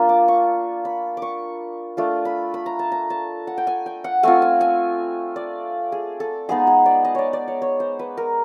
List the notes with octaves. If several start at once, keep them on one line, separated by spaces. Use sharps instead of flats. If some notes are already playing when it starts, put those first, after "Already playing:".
Already playing: A#3 D4 F4 C6
D6
C#6
B5
D6
C#6
A3 D4 F4 C6
B5
B5
A#5
A5
A#5
A5
F#5
G5
G#5
G5
F#5
A3 C4 F4 G#5
G#5
G#5
D5
G#4
A4
G#3 B3 D#4 G#4
G#4
D5
D#5
C#5 D5
D5
C#5
C#5
C5
B4
A#4